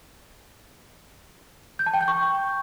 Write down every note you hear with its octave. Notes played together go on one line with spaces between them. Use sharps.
G6
A5
G5
G6
C#6